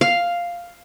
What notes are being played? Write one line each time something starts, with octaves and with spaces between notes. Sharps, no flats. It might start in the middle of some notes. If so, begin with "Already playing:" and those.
F5